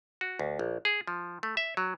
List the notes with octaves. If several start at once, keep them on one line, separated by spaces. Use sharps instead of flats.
F#4
D2
A#1
G#4
F3
A3
E5
F#3